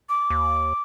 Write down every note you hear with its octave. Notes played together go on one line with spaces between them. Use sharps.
D6
D#2